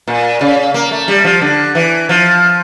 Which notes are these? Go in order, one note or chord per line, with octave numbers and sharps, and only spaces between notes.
A#2
C#3
A#3
A3
G3
F3
D3
E3
F3